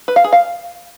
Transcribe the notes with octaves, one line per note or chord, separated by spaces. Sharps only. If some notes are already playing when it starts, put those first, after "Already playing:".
B4
F5
G#4
F5